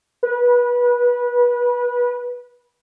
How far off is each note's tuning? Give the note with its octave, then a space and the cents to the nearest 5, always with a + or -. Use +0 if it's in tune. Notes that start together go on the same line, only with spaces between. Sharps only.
B4 -25